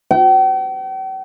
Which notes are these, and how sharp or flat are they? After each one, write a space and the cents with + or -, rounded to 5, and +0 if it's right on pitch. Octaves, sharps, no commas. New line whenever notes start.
G5 -45